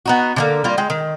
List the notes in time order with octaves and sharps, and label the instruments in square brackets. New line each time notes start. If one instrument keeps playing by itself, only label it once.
[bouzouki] B3 D#4 F#4
D3 G#3 A#3
G3 A#3 F4
G#3 G5
D#3